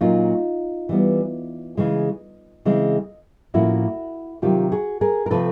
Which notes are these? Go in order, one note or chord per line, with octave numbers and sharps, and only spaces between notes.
A#2 F#3 A#3 C#4 D#4 F4
E3 G3 B3
C#3 E3 G#3
C#3 E3 G#3 C4
A2 F3 A#3 C#4 E4 F#4
C3 D#3 F#3 F4 G4
F#4 G#4
G#4 A#4
A#4
C3 F3 A3 C4 A4 B4